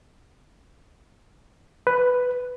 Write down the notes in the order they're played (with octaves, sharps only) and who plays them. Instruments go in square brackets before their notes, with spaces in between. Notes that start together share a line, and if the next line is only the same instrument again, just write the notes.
[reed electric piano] B4